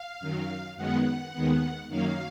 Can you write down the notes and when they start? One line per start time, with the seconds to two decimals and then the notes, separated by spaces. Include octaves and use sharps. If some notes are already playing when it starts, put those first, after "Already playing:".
Already playing: F5
0.20 F#2 D#3 F#3
0.77 F#2 D#3 G#3 B3 F#5
1.33 D#2 D#3 G#3 B3
1.89 F#2 D#3 F#3 A#3 F5